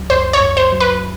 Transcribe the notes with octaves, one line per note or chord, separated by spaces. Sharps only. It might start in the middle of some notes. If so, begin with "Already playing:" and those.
Already playing: C#2 F#3
F#2 C5
C#5
F#2
C5
F#3
B4